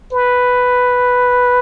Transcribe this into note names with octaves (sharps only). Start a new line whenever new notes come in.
B4